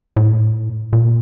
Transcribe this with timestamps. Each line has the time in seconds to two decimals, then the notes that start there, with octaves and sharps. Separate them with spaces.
0.16 A2
0.93 A#2